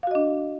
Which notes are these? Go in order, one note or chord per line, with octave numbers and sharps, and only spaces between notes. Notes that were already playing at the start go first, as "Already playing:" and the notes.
D4 F#4 D#5 F5